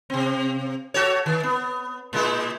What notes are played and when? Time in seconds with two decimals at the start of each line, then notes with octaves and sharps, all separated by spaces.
0.10 C3 C4
0.94 F#4 A4 C#5
1.26 D#3
1.43 B3
2.13 A#2 G#3 E4